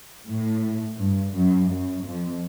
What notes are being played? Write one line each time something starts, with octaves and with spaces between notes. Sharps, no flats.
A2
G2
F#2
F#2
F2